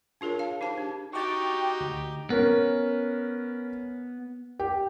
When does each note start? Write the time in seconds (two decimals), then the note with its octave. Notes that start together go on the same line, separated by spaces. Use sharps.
0.21 D4 F4 G#4 A#4 C#5
0.39 F5 A5
0.61 D#4 G4 C5 A5
0.77 D4 G4
1.13 D#4 F#4 G4 G5 C#6 D6 A6
1.81 D2
2.30 B3 C#4 A#4
4.59 G4